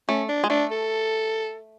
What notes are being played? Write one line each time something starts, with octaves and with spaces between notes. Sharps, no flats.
A3 C#4
D4
G#3
A3 D4
A4